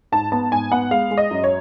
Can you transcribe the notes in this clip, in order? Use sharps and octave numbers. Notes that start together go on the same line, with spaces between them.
G#2 A5
B3 A5
G#2 G#5
B3 F#5
G#3 F5
G#3
D#5
F#2
C#5